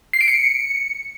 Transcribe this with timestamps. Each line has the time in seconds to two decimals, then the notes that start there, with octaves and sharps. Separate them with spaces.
0.13 C7
0.21 D7
0.28 C#7